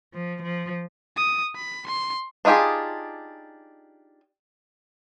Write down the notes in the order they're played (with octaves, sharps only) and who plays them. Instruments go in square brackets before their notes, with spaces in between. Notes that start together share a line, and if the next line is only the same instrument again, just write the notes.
[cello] F3
F3
[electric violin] D#6
B5
C6
[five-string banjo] D4 D#4 F4 G4 G#4